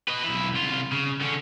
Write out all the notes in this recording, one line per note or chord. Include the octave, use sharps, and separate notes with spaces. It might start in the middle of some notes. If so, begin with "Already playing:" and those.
B4 D#5
B1 E4
C2 F4
C#3
D3 C#4